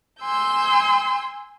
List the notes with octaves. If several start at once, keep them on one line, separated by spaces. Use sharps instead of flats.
G#5 C6 E6 G6